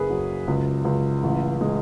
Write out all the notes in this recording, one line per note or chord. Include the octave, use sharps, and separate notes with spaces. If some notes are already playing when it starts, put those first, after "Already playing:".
Already playing: F#1 G#4 B4
F#3
C#2
C#2
A1
G#3